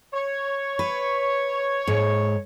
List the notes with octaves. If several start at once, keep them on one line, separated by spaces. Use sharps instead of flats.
C#5
B4
G#2